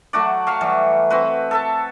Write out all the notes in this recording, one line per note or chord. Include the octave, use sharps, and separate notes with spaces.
F#3 A3 F#4 D5
F#3 F5 C#6
E3 F#3 G3
C4 F#4 B4
A4 E5 A5